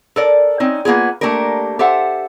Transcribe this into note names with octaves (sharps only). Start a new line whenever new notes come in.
A4 A#4 D5
C4 C#4 D#4
A#3 B3 F4 G#4
A3 A#3 D4 G4 A#4
G4 A4 C5 E5 F#5